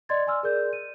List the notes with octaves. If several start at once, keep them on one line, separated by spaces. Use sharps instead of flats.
D5 D#5 C6 G#6 A6
D5 G#5 C6 E6 F6
G#4 A#4 D5 G6
D#7